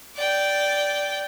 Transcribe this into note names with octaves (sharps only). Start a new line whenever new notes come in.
D5 G5